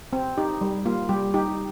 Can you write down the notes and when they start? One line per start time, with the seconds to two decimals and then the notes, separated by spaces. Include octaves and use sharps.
0.13 C4
0.37 D#4 G4
0.61 G3
0.86 A#3 F4
1.09 G3 G4
1.34 D#4 G4